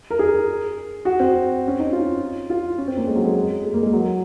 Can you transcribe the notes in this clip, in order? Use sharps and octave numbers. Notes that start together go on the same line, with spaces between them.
A#4
G#4
F#4
C4
C#4
D#4
F4
F4
C#4
C4
A#3
G#3
F#3
G#3
G#3
A#3
G#3
F#3